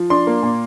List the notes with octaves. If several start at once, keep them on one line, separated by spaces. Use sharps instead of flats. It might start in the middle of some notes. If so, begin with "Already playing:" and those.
Already playing: F3
D4 C6
A#3
A#2